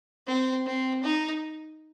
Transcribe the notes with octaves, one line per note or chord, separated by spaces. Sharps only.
C4
C4
D#4